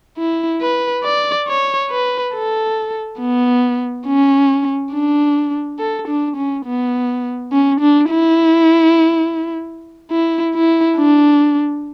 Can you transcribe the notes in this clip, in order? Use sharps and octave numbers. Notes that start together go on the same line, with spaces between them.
E4
B4
D5
C#5
B4
A4
B3
C#4
D4
A4
D4
C#4
B3
C#4
D4
E4
E4
E4
D4